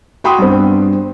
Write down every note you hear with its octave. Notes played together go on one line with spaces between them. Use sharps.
F#4 G5 B5 C6 D#6
G2 B3 C4